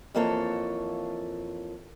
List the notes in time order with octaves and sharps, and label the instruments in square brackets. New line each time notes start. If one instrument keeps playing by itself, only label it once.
[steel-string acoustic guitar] F2 E3 A#3 F4 A4 C#5